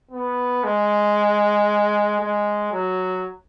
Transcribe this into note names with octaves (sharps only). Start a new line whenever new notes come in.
B3
G#3
G#3
F#3